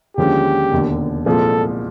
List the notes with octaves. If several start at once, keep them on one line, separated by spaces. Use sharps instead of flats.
D#2 D3 F3 G#3 C#4 G4
E1 D#2 D3
C2 A#2 F3 G#3 A4